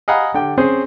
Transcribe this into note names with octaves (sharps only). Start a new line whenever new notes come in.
D#5 F5 F#5 G#5 A#5 B5
D3 G4 G5
C4 C#4 G#4 C5